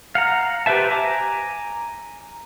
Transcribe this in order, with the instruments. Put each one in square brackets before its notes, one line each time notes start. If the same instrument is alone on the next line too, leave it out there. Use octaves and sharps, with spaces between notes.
[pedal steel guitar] F5 F#5 A#5
G4 B4 C5 E5 A5
G#5 A#5 D6